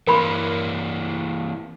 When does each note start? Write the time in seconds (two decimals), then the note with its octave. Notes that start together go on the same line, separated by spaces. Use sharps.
0.07 E3 A#3 A#4 B5 C6